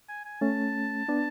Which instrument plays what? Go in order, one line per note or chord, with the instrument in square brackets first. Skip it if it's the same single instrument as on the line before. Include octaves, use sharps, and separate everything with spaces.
[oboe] G#5
G#5
[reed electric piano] A3 C#4 [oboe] A5
[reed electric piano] B3 D4